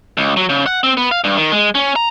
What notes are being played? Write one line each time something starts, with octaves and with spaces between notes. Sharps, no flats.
C#2
F#3
C#3
F#5
C4
B3
F5
G2
D#3
G#3
C#4
A#5